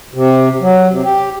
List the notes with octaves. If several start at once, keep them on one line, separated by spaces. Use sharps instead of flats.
C3
F#3
C3
G4